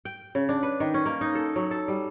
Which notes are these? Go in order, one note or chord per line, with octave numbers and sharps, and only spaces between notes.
G5
C#3
D4
B4
D#3
C#4
A#3
D#4
A4
F#3
A4
G3